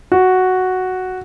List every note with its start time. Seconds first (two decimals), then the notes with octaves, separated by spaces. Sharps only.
0.12 F#4